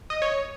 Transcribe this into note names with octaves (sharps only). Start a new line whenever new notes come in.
D#5
C#5